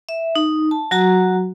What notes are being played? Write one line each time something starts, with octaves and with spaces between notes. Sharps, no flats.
E5
D#4
A5
F#3 F#4 A#5